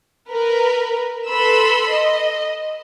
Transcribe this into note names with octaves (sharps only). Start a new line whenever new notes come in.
A#4 B4
A4 B4 B5 C6 E6
D#5